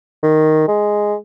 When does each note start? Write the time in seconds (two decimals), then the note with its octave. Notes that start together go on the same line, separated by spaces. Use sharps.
0.23 D#3
0.68 G#3